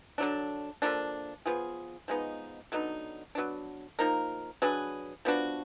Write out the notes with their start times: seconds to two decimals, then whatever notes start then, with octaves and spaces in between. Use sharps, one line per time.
0.18 D3 F#3 D4
0.82 D3 F3 A#3 D4
1.46 F3 B3 F4 G#4
2.08 F3 G#3 B3 D#4
2.72 D3 F#3 B3 D#4
3.35 F#3 B3 D4
3.99 F3 A#3 D#4 A#4
4.62 F#3 D4 G#4 B4
5.25 F3 B3 D4 F#4